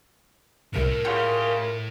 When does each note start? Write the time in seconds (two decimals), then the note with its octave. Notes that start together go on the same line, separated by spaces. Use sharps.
0.74 C2 A2 C3 A3 A#4 D7
1.05 C#3 F4 G4 F#5 G6 C7